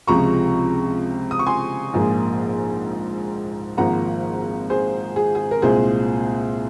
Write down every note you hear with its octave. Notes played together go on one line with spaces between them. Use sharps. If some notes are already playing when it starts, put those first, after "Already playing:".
C#2 C3 F3 G#3 A#5 C#6
D#6
C#6
G#5 C6
A#1 G#2 F3 A#3
G#1 G#2 F3 A#3 F#5 A#5
G#4 C5
G#4
G#4
A#4
C2 A#2 G#3 G#4 C5